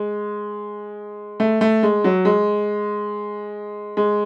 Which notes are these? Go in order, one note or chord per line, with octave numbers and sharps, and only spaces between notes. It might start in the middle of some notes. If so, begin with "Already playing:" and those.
Already playing: G#3
A3
A3
G#3
F#3
G#3
G#3